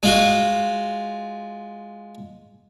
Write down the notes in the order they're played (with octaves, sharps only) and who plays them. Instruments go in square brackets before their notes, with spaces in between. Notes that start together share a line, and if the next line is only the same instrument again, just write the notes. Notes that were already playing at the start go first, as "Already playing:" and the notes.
[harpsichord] G#3 F4 F#4